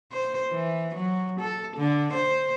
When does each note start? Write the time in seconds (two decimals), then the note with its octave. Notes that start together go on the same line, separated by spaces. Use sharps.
0.12 C5
0.51 E3
0.95 F#3
1.40 A4
1.76 D3
2.13 C5